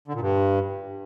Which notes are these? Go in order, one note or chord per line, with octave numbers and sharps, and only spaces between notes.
D3
A#2
G2